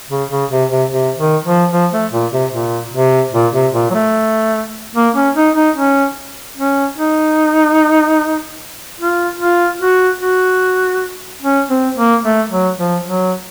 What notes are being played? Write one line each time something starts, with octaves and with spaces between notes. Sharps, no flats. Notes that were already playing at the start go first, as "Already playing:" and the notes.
C#3
C#3
C3
C3
C3
D#3
F3
F3
A3
A#2
C3
A#2
C3
A#2
C3
A#2
F#3
A3
A#3
C#4
D#4
D#4
C#4
C#4
D#4
F4
F4
F#4
F#4
C#4
C4
A#3
A3
F#3
F3
F#3